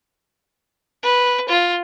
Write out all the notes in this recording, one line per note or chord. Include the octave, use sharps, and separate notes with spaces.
B4
F4